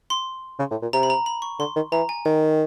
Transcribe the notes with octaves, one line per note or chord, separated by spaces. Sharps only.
C6
C#3
A2
A#2
C3 A#5
B5
A#5
B5
C#6
D3 C6
D#3
E3 A#5
G#5
D#3 G5